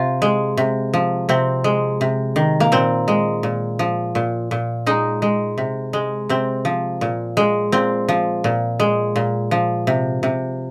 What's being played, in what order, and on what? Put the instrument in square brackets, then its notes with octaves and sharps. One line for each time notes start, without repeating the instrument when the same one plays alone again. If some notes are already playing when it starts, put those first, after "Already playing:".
Already playing: [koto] C3 F4
G#3
C3
F3
C3 C4
G#3
C3
D#3
A#3
A#2 C4
G#3
A#2
F3
A#2
A#2
G#3 D#4
G#3
C3
G#3
C3 C4
F3
A#2
G#3
A#2 C4
F3
A#2
G#3
A#2
F3
C3
C3